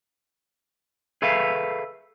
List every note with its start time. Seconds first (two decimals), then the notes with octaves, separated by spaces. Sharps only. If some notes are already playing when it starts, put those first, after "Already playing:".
1.22 G#4 A4 B4 E5 F5